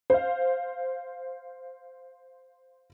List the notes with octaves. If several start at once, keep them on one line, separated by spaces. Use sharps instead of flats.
C5 F5